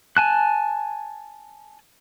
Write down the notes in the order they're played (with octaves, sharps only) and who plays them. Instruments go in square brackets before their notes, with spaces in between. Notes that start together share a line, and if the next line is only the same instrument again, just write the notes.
[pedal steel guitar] G#5 A5 F#6